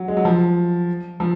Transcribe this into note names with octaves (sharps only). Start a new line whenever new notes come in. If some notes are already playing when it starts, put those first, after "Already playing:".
Already playing: F#3
G#3
F#3
F3
F3